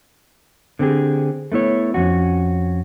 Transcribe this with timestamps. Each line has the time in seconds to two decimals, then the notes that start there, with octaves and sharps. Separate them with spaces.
0.79 D3 C4 G4 G#4
1.52 A3 B3 E4 C#5
1.94 F2 C#4 F#4